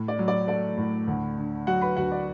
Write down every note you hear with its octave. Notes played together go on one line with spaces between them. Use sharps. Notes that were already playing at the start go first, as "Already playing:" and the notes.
Already playing: A2
D5
F#3
D5
A3 D5
A2
D2
D3
F#3 F#4 F#5
B4 B5
D2 F#4 F#5
D5